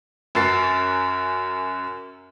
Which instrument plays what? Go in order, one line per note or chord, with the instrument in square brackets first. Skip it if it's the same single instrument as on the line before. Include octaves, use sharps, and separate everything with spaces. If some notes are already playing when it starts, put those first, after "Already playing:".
[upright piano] F#2 F#4 A#4 C#6 A6 C7